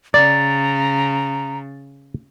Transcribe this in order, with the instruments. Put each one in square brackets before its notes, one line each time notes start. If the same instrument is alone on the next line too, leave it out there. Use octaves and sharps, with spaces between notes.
[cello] C#3 [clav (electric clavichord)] D5 [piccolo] A#5 [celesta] A6